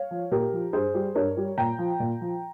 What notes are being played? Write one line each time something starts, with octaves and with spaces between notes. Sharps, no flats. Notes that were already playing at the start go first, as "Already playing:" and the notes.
Already playing: C#5 F5
F3
A#2 G4 A#4
F3
G2 G#4 C5
G3
G2 A#4 C#5
G3
A#2 G5 A#5
F3
A#2
F3